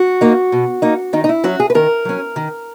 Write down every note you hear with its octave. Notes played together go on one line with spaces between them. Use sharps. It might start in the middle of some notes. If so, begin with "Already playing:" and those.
Already playing: F#4
A#3 D#4
B2
A#3 D#4
D#3 D#4
D#4
E4
F#3 C#4 F#4
G#4
B4
D#3 A#4
F#3 C#4
D#3